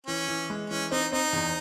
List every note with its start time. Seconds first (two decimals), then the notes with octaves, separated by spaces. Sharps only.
0.07 E3 C#4
0.28 E3
0.50 G#3
0.70 E3 C#4
0.91 C4 D#4
1.12 C4 D#4
1.33 E2